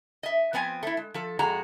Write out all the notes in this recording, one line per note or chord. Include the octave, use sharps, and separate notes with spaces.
D#5 E5
F3 B3 C4 F#5 G#5
A3 E4
G#3
F3 A4
F2 G#3 F#4 A#5